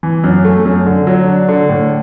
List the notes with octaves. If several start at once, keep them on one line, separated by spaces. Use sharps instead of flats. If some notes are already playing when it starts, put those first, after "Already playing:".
E3
F#2
A3
F#2
D3
F#3
D4
D3
A2